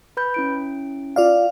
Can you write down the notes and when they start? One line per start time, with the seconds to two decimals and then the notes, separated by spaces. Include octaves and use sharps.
0.17 B4 B5 G6
0.34 C#4 E4 D7
1.16 F4 D5 F5